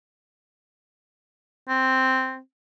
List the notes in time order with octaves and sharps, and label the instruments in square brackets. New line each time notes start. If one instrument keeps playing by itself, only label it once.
[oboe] C4